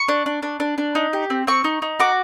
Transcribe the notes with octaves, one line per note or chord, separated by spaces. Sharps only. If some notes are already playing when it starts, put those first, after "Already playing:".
Already playing: C#6
D4
D4
D4
D4
D4
D#4
G4
C4
C4 C#6
D#4
D#4
F#4 D6